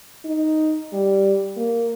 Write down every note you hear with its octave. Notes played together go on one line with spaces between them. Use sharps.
D#4
G3
A#3